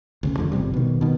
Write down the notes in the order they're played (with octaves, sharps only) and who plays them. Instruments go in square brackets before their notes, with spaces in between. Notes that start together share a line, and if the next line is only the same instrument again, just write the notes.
[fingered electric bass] D2 C#3 C#4
F2 D3
G1 A2 C3 G3
B2 D#3
B2 D#3